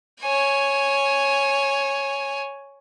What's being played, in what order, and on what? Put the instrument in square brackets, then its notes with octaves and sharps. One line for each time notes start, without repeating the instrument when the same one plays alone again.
[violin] C#5 G#5